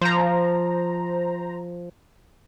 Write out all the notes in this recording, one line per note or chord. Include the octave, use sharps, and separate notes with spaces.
F3 C5 A#5